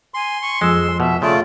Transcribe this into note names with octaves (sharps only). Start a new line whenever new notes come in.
G#5 C6
C#6
F2 F3 G#3 E6
B2 E5
C#3 A3 F4 D5